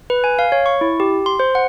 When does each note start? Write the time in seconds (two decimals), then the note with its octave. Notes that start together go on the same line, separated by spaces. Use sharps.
0.10 B4
0.24 G#5
0.39 F5
0.52 C#5
0.66 C#6
0.81 E4
1.00 G4
1.26 C6
1.40 C5
1.55 F#5